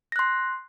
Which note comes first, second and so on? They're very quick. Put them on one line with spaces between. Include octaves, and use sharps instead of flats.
A#6 F#6 C6